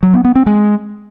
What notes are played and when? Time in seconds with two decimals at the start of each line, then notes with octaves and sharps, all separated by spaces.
0.03 F#3
0.14 B3
0.25 B3
0.35 C4
0.46 G#3